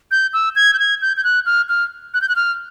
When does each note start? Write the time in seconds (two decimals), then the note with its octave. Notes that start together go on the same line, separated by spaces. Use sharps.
0.11 G6
0.33 E6
0.56 G#6
0.74 G6
0.79 G#6
1.02 G6
1.17 G6
1.24 F#6
1.46 F6
1.69 F6
2.14 F#6
2.21 G6
2.29 F#6
2.36 F6